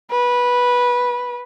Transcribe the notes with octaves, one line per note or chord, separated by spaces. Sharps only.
B4